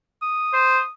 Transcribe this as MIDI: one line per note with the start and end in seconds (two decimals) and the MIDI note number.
0.22 0.90 87
0.54 0.82 72